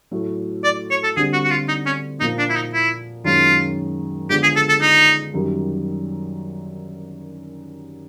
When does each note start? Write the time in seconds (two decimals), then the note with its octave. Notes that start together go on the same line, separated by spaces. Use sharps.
0.11 A2 F#3 A3
0.64 D5
0.90 C#5
1.04 A4
1.16 D3 G3 C4 G#4
1.33 F#4
1.43 F#4
1.50 F4
1.68 D#4
1.86 C#4
2.20 A#2 F3 A#3 D#4
2.38 D4
2.49 E4
2.56 D#4
2.73 E4
3.24 F#2 D#3 G#3 C#4 F4
4.30 D3 F3 G#3 B3 G4
4.43 G#4
4.56 A4
4.69 A4
4.81 D#4
5.34 F#2 D#3 G3